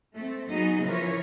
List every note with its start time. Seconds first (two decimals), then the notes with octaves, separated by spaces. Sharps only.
0.15 A3 C4
0.51 F#3 B3 D#4 F#4 G#4 D#5
0.82 C#3 E3 F3 A#4 B4 C#5